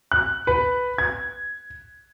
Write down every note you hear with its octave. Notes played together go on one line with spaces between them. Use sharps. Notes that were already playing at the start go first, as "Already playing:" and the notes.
F#6
B4
G#6